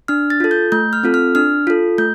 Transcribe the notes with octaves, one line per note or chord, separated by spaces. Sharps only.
D4 F6
A6
F4 A4
G6
A3 G6
F6
C4 F4 A4
F6
D4 F6
F4 A4
A3 G6